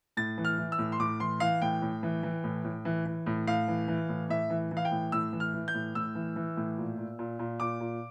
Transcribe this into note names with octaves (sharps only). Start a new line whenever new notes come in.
A2 A6
E3
F6
E3
E6
A2
C6
A2 D6
E3 C6
E3 F5
A2 G5
A2
E3
E3
A2
A2
E3
E3
A2
A2 F5
E3
E3
A2
A2 E5
E3
E3
F5
G5
A2
A2 E6
E3
F6
E3
G6
A2
A2 E6
E3
E3
A2
A#2
A#2
A#2
A#2
A#2 D6
A#2